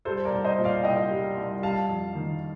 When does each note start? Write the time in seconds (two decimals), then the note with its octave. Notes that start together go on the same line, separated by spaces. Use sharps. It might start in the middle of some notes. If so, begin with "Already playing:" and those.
0.05 G3 A4 C5
0.25 A#4 D5
0.31 C2
0.44 C5 D#5
0.58 A#2
0.64 D5 F5
0.83 C2 D#5 G5
1.11 G3
1.37 C2
1.62 G3 F5 A5
1.89 F2
2.15 D#3